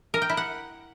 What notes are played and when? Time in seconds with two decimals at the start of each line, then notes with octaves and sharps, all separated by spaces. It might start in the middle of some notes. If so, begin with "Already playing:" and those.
0.14 A#4
0.22 G5
0.29 E4
0.37 F#5